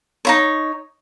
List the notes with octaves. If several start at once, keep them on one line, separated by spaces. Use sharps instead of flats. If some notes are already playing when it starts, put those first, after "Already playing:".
D#4 E4 C#5